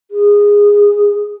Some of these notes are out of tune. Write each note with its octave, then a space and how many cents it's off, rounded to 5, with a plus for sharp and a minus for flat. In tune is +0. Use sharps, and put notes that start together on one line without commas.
G#4 -15